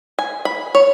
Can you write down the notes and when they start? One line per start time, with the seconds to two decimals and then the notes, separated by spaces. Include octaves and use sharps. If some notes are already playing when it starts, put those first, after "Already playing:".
0.19 G#5
0.45 B5
0.75 C#5